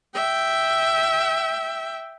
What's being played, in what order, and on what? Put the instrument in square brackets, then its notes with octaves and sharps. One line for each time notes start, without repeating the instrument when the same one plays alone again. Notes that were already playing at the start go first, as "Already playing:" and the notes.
[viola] E5 G5